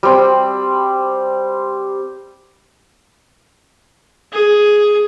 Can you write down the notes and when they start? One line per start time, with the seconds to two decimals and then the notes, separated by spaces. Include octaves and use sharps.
0.03 G3 C4
4.33 G#4